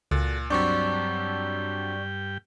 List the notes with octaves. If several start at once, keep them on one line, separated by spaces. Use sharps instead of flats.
C#2 A#2 F#4 A4
G2 F#3 C4 D4 D5 G5 C#6